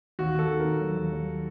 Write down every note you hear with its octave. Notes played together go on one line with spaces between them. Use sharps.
D#2 F#4
D#2 A4
D#3
A#4
D#2
F#3
D#2
F#3